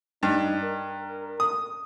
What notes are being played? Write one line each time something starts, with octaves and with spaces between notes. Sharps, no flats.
G2 D#4
A#4
D#6